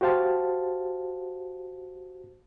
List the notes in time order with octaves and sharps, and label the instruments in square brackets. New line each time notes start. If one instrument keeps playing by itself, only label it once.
[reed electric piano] F#4 G4 C5 F5 A5